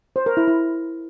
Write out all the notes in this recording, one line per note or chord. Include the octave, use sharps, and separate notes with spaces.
C5
A#4
E4
E4